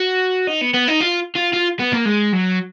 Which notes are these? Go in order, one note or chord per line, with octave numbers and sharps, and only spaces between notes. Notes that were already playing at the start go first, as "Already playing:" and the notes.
Already playing: F#4
D#4
B3
B3
D#4
F4
F4
F4
B3
A#3
G#3
F#3